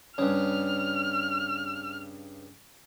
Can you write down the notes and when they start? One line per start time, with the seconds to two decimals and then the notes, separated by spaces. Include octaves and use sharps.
0.18 G2 C#3 F6